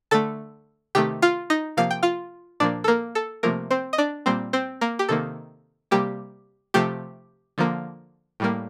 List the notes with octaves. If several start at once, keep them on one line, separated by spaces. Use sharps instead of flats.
D3 A3 A4 A5
C3 D#3 A3 G4 G5
F4 F5
D#4 D#5
C3 F3 A#3 F5
G5
F4 F5
A#2 F3 A#3 D4 D5
A4
A#3 A#4
A4
C3 F3 A3 A#3 A#4
C4 C5
D#5
D4 D5
A#2 G3 A#3 C4 C5
C4 C5
A#3 A#4
G4
C3 D#3 A#3 A4
C3 G3 A#3 G4
C3 F3 A3 G4
D3 F3 A#3
A2 G3 A#3